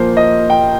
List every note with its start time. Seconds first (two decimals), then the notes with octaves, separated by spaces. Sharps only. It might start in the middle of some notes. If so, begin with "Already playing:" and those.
Already playing: A#2 F3 A#3 C5
0.17 D#5
0.50 G5